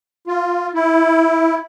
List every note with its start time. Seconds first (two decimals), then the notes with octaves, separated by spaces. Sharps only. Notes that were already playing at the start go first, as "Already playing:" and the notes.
0.27 F4
0.74 E4